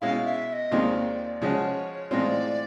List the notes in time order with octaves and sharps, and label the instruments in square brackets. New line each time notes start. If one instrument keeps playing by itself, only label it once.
[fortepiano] B2 G#3 C#4 E4 [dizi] F5
[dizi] E5
E5
D#5
[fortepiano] D#2 D#3 G#3 C4 F4 [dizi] D5
[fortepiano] C#3 F3 G#3 C#4 F#4 [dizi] C#5 D5
[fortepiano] A2 E3 G#3 C4 F4 [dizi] D5